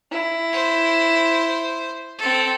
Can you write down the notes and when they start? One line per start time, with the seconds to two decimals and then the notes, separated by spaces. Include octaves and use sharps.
0.12 E4
0.53 C5
2.18 C4 A4